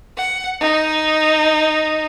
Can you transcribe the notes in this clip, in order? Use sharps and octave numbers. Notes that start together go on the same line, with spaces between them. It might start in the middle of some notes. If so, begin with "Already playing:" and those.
F#5
D#4